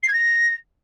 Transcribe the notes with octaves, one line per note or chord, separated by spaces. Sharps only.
C7
G#6
A#6